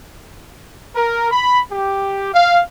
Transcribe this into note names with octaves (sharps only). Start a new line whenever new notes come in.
A#4
B5
G4
F5